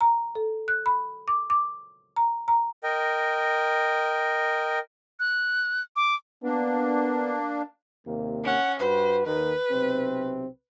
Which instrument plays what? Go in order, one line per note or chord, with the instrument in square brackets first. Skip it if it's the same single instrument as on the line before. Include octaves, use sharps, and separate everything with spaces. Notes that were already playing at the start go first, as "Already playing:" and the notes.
[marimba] A#5
A4
F#6
B5
D6
D6
A#5
A#5
[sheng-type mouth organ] A#4 D#5 G5
[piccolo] F#6
D6
[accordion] A#3 D4 [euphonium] B3
[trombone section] D#2 C3 A#3
[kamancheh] C#4 F#5
[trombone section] G2 F#4 B4 [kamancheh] C5
[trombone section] D#2 D#3 [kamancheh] B4
[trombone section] B1 C3 C4